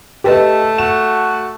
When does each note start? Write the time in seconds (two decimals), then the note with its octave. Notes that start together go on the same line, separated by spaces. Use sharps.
0.24 A3 G4 B4 D#5 A5
0.78 F#4 E7